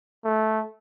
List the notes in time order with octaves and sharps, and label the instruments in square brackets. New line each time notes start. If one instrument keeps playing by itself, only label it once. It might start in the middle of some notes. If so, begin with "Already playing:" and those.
[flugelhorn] A3